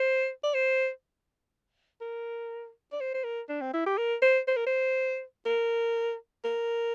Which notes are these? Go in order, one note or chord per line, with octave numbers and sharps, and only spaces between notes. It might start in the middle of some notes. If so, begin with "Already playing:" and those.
Already playing: C5
D5
C5
A#4
D5
C5
C5
A#4
D4
C4
E4
G4
A#4
C5
C5
A#4
C5
A#4
A#4